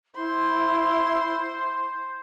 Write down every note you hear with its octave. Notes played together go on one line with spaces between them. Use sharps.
E4 C5 C6